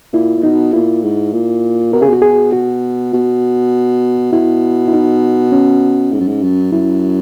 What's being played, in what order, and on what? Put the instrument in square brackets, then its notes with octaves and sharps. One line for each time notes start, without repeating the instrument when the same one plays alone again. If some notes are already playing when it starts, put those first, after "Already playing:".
[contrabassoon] A#2 [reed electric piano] E4
[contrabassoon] A#2
[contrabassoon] B2 [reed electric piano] D#4
[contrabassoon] A#2 [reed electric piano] E4
[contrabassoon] G#2
A#2
[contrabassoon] B2 [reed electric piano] A#4
[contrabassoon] C#3 [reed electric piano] G#4
[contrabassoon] B2 [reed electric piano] F#4
[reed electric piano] G#4
F#4
[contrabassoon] B2
[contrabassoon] B2 [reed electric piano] E4
[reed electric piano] E4
D#4
C#4
[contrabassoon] G#2
F#2
G#2
F#2
[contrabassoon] F#2 [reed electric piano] E4